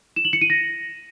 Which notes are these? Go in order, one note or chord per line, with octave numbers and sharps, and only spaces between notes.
E7
F#7
C#7
D#7
A#6